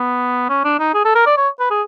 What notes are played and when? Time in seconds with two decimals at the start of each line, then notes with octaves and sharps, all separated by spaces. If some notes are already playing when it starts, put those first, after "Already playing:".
Already playing: B3
0.49 C#4
0.64 D4
0.79 D#4
0.94 G#4
1.05 A4
1.15 A#4
1.27 D5
1.37 C#5
1.60 B4
1.71 G#4